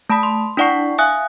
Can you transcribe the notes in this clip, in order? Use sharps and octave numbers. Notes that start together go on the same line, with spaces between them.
A3 A5 B5 D#6 B6
C6
D4 E4 D5 F#5 C#6 C7
E5 F5 G#5 D#6 F#6